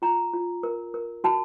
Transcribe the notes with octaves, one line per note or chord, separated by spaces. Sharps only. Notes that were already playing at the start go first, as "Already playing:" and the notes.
F4 A#5
F4
A#4
A#4
F#4 A5